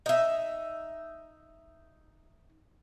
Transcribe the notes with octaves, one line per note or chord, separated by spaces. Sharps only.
D#4 E5